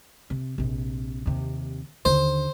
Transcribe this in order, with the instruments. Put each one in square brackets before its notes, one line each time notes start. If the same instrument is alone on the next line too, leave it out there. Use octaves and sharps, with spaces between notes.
[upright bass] C3
A#1 C3
D#2 C3
[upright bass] D#2 D3 [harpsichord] C5